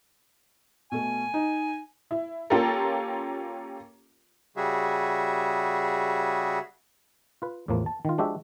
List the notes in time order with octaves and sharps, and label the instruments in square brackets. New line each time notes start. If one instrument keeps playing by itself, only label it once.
[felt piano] B2 A3 [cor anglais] G#5
[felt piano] D#4
[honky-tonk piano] E4
A#3 C#4 F4 G4 A4 A#4
[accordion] C#3 G3 F#4 G#4 E5
[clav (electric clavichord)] F4 B4
E2 A2 E3 F3 A#3
A5
D#3 F4
F3 G#3 D4 F#4 G4 E5